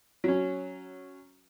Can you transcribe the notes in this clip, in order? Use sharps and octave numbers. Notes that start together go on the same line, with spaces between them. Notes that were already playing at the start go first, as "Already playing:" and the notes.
F#3 C#4